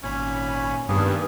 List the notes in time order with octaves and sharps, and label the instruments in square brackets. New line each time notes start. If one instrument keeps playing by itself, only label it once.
[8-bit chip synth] G#1 A#2 B5 [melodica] C#4
[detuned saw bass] G2 [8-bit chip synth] D#3 A#3 B3 [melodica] G#4